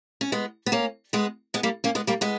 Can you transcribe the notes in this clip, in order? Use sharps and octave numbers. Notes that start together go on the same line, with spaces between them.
C#4
G#3 B3
B3
A#3 C#4
G#3 B3
G#3 B3
G3 A#3
A#3 C#4
G#3 B3
G3 A#3
G#3 B3